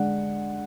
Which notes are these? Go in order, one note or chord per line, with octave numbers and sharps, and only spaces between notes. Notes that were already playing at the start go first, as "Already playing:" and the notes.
Already playing: D3 G#3 D4 F#5